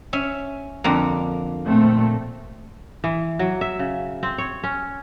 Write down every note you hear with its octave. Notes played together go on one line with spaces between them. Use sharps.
C#4 E5
F2 D3 A#3
A#2 A3 C4
E3
F#3
E5
C#3
C4
C#5
C#4